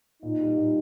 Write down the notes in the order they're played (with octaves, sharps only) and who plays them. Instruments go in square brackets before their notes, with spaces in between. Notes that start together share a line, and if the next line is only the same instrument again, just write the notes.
[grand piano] A#2 [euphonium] D#4
[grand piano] G3
A#2